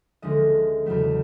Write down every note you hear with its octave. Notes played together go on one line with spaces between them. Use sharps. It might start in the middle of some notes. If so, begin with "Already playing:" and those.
D2 D3 F3 G#3 C#4 D#5
E2 C#3 F#3 A3